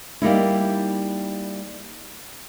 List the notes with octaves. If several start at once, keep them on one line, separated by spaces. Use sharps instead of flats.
G3 A#3 D#4 E4